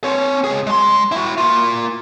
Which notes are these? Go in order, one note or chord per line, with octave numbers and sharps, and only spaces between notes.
C4 C#5
C#2 G#4
G#3 C6
E4 F#4
A#3 F4